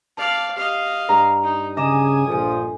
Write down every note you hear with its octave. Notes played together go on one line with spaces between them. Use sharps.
D5 F5 A5
G4 D#5 F5
G2 A#5
D#4
C#3 D#5 G#5 A#5 D6 D#6 E7
A#1 F3 A4 G#5